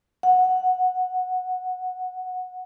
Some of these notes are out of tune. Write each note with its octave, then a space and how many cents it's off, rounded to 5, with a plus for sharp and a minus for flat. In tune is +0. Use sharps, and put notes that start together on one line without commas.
F#5 -10